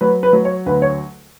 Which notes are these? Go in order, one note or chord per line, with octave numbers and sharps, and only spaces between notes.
F#3 B4
B4
F#3
C#5
D2 B4
C#5